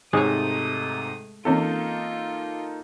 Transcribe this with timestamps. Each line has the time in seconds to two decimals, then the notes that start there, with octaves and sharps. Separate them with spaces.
0.13 G#2 C3 G#3 A3 D#4 C#5 D#6
1.45 E3 A#3 C4 C#4 D#4 F4 A4